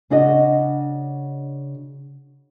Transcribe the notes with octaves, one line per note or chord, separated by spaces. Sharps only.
C#3 D4 F#4 D#5